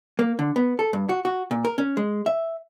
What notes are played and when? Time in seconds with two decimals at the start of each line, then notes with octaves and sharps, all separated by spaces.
0.19 A#3
0.39 D3
0.56 B3
0.79 A4
0.93 G2
1.09 F#4
1.25 F#4
1.51 A#2
1.65 A#4
1.78 C#4
1.97 G#3
2.26 E5